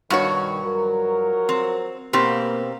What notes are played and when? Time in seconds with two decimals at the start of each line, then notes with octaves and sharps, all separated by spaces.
0.10 G2 B2 D#3 F#4 C#5
0.64 F3 F#3 A#4
1.49 C4
2.13 B2 A#3 C4 G4